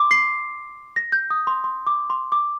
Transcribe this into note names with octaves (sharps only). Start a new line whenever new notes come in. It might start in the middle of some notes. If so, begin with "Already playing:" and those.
Already playing: C6 D6
C7
A#6
G6
D#6
C6
C6
D6
C6
D6